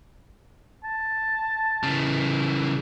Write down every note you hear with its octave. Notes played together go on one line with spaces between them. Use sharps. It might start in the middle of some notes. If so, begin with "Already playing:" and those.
A5
C#3 E3